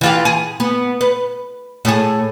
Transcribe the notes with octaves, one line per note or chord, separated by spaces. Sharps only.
E3 F4 G4
G#4
B3
B4
A2 G#4